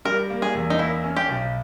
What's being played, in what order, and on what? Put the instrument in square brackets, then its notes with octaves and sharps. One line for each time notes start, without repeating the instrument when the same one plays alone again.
[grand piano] G3 [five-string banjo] A#4
[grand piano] A#3
[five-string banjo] G#4
[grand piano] E2
[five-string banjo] D#4
[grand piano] A#3 [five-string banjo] E4
[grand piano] C#4
[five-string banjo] G4
[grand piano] B1